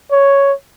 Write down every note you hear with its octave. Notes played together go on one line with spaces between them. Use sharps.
C#5